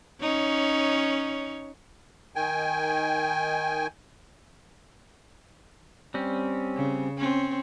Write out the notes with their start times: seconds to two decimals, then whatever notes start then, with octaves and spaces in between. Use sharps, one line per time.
0.21 C#4 D#4 C#5
2.36 D#3 G5 G#5
6.14 G3 C4 C#4
6.76 C#3
7.18 C4 C#4